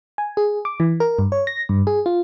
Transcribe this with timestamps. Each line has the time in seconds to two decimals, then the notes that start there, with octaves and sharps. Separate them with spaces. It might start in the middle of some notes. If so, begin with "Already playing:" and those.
0.18 G#5
0.37 G#4
0.65 D6
0.80 E3
1.00 A#4
1.19 G2
1.32 C#5
1.47 A#6
1.69 G2
1.87 G#4
2.06 F4